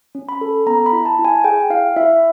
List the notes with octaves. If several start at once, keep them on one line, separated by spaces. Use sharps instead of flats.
C#4
B5
A4
B3 A#5
B5
E4
A5
E4
G#5
G#4 G5
E4 F5
E4 E5